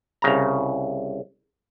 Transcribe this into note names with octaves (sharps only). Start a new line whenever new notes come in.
C2 C#3 A#5